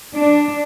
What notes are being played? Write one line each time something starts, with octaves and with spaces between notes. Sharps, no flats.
D4